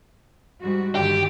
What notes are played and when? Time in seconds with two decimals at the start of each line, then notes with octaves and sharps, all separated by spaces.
0.60 G#2 G3 F#4
0.95 G2 D3 D#3 G4